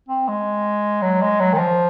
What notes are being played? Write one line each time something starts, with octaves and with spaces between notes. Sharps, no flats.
C4
G#3
F#3
G#3
F#3
D#3
F3